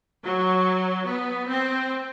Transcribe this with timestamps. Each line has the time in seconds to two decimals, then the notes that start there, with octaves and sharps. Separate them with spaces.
0.24 F#3
1.07 B3
1.48 C4